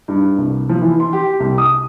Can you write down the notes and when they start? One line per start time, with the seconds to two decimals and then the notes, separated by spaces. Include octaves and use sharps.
0.08 G2
0.38 C2
0.69 F3
0.81 E3
1.00 C6
1.13 G4
1.40 C2
1.58 D#6